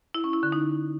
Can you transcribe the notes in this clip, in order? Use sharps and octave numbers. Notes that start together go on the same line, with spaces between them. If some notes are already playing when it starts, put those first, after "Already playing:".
E4
C#4
E4
D3
D#4